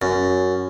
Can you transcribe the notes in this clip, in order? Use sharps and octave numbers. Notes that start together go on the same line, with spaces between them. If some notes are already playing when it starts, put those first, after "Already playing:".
F#2